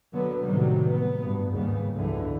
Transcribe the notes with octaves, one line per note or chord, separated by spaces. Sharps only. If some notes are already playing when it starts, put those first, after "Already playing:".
D3 F#3 B3
A2 C3 D#3 F#3 G3
B3
G2
D#2 G#2 C#3 G3 B3
C#2 F#2 D3 E3